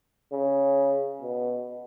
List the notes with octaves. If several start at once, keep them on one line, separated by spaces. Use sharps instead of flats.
C#3
B2